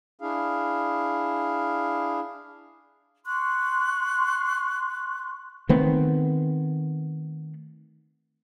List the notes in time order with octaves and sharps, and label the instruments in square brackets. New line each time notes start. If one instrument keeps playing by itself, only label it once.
[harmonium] D4 E4 G#4 F5
[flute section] C6 C#6 F#6
[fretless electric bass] D#3 A3 B3 C4